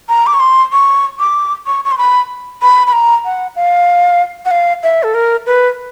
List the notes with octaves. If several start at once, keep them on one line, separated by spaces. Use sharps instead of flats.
A#5
D6
C#6
C6
C#6
D6
C#6
C#6
C6
B5
B5
B5
A#5
F#5
F5
F#5
F5
E5
A4
A#4
B4